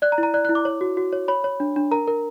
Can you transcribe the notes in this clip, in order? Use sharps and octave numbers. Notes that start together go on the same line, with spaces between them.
D5 F#6
A#5
E4
A#5
D5 F#6
F#6
E4
D6
C#5
F#4
F#4
C#5
C#5 B5
C#5
D4
D4
A#4 A#5
A#4